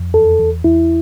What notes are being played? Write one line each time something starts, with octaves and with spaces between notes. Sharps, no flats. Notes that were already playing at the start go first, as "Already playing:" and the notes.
Already playing: F2
E2 A4
E2
E2 E4